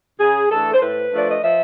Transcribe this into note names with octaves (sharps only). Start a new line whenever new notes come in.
C#3 G#4
E3 A3 D4 A4
C5
A2 B4
F3 A3 D4 D5
D#5
F3 E5